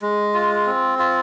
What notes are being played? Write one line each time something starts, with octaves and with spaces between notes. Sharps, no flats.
G#3
F4
C4
F4